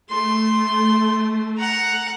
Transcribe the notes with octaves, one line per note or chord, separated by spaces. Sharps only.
A3 C6
F#5 A#5